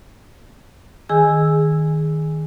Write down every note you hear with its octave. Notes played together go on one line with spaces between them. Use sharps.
D#3 G#4 G#5 E6